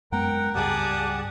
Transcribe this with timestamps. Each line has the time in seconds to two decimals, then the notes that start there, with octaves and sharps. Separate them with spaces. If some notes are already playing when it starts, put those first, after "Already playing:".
0.12 F#2 G#3 B3 A#4 F#5 G5
0.55 C#2 G2 G4 G#4 D5 F#5 A5 D#6